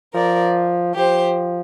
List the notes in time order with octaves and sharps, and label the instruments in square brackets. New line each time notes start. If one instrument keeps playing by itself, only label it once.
[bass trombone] F3 [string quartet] A#4 D5
[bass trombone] F3 [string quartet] G4 C5